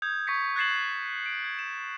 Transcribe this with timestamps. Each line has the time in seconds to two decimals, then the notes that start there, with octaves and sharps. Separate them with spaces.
0.02 D#6 G6 G#6
0.27 C#6 G#6 A#6 B6 C#7
0.56 F#6 G#6 A6 C7 E7 F#7
1.26 D7
1.44 G#6
1.59 E7